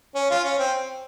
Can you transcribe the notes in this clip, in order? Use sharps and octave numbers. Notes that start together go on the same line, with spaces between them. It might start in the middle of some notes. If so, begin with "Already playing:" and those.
C#4
F4
C#4
C4